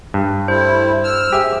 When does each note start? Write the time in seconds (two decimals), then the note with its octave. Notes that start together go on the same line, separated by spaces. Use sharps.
0.14 G2
0.48 G3 A3 E4 C5
1.04 E6 F6
1.32 G4 G#4 E5